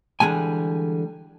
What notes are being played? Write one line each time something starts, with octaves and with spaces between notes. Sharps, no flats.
D3 E3 G3 G#3 G#5